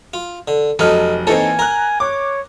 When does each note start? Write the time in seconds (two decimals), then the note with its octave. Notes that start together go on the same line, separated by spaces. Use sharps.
0.14 F4
0.48 D3
0.79 F1 F#3 D#4 A4 F6
1.27 E3 A#3 C4 D#4 A4 C#5 G#5
1.59 A#4 A#5 F#6
2.00 C#5 D6